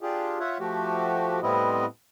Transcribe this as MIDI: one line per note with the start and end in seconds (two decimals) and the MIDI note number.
0.01 0.39 62
0.01 0.39 65
0.01 0.39 67
0.01 0.39 68
0.40 0.58 65
0.40 0.58 73
0.40 0.58 76
0.40 0.58 78
0.60 1.40 53
0.60 1.40 57
0.60 1.40 66
0.60 1.40 67
1.43 1.86 45
1.43 1.86 55
1.43 1.86 59
1.43 1.86 60
1.43 1.86 64
1.43 1.86 75